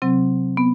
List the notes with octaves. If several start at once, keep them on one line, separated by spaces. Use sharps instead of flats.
C3 F#3 C4
B3